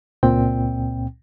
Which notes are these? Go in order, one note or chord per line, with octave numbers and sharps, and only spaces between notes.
C#2 A#2 C4 G5